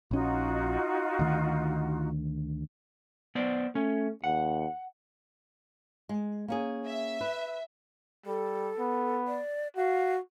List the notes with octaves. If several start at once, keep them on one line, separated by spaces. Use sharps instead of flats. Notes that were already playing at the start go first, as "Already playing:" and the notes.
A#1 C#4 D#4 F4 F#4
D2 D#3
B3 C5 D5
A3 C#4
D#2 F#5
G#3
A#3 C#4 G#4
E5
B4
G3 A4
B3
D5
F#4 F5